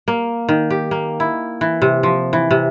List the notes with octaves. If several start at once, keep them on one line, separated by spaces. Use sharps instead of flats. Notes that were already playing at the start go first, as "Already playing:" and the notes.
A#3
D#3
G4
A#3
E4
E3
C3
F3
E3
C3